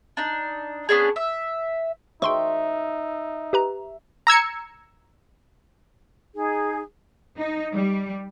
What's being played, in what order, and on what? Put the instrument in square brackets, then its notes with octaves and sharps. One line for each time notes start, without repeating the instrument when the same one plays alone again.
[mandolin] D4 D#4
B3 C#4 D4 G#4
E5
[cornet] D#4 [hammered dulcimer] E5 [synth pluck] G5 C6 C#6
[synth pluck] G4 B4 A#5
A#5 E6 G#6 C#7
[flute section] D#4 G#4
[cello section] D#4
G3